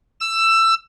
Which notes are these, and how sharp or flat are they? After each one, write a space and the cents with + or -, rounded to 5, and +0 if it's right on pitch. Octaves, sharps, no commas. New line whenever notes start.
E6 +15